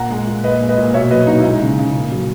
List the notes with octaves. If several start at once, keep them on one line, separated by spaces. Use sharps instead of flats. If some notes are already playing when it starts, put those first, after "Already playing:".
Already playing: A#2 F#5 A#5
G#3
A#2
A#2 B4 D#5
G#3
B4 D#5
A#2
B2 C#5 E5
F#3 B4 D#5
B2 D#4 F#4
E4
G#3 D#4
C#3
C#3
A#2
F#3